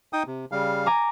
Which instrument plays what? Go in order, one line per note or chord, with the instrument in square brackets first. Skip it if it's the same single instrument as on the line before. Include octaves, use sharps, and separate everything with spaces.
[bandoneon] D#4 G5 D#6
C3
C#3 G3 F5
[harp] G#5 A#5 D6